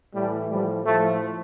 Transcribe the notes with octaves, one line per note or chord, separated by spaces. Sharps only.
A2 E3 G3
A2 F3 G3
A2 F3 A3